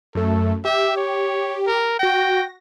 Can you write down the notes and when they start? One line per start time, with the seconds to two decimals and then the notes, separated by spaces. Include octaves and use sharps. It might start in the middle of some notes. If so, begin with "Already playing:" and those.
0.15 F#2 A3 A4
0.65 G4 E5
0.96 C#5
1.67 A#4
1.99 F#4 G5 A#6